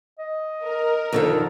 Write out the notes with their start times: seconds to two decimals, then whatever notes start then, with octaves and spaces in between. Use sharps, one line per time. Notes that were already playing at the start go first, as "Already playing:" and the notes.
0.19 D#5
0.65 A#4
1.13 F2 D3 D#3 A4